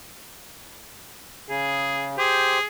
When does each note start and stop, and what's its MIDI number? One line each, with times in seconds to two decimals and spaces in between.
1.49 2.16 49
1.49 2.09 68
2.18 2.59 67
2.18 2.65 68
2.18 2.59 72